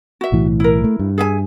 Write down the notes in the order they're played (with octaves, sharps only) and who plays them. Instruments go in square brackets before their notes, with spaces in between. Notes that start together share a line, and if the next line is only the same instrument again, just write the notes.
[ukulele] F#4 E5
[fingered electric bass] B1 A2 E3
[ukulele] E4 A#4
[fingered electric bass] A3
G2
[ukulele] G#4 E5 G#5